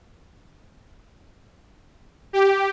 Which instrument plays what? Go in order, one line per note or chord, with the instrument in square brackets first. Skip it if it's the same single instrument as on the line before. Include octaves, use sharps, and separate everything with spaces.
[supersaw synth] G4